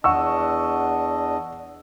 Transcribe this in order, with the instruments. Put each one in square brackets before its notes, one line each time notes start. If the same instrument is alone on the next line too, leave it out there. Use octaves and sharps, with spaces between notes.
[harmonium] E2 D4 D#5 [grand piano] F#5 C#6 E6